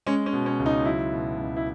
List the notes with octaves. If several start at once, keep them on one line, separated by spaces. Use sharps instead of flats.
G#3 C#4
C#4
B2
C#4
C#2
D#4
F#3 E4
B2
C#2
E4